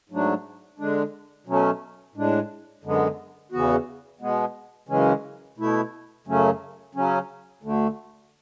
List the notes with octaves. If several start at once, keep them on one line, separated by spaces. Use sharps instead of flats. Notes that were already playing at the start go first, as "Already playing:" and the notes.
G#2 F#3 A3 D4
D3 G#3 D4
B2 F#3 A3 C#4
A2 G#3 D4
F#2 D3 G#3 B3
E2 C#3 E3 B3 F#4
B2 G#3 B3
F#2 C#3 E3 G#3 C#4
B2 A3 E4
F#2 C#3 F#3 A3 C#4
C#3 F#3 C#4
D2 D3 A3